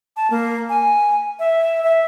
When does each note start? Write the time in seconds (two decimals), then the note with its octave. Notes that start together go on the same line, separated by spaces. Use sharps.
0.16 A5
0.30 A#3
0.69 G#5
1.39 E5
1.84 E5